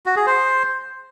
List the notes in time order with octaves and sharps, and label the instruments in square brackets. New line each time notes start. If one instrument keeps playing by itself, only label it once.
[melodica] F#4
G#4
C5